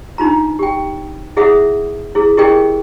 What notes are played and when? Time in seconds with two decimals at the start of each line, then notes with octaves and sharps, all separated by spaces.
0.18 D4 D#4 F4 A#5
0.59 G4 G5
1.37 E4 G#4 E5 F#5 D#6
2.15 E4 G#4
2.37 E4 G4 G#4 A#4 D#5 G5